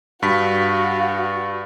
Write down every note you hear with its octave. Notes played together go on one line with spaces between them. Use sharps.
G2 F#4 F5 B6